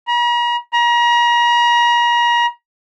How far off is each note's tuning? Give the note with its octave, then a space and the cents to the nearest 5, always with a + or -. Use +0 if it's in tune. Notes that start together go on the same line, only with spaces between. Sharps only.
A#5 +45
A#5 +35